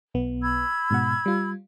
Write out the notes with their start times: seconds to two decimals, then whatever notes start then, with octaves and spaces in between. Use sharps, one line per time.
0.14 B1 B3
0.41 B5 E6 G#6
0.90 G#2 B2 F#5
1.26 G3 F4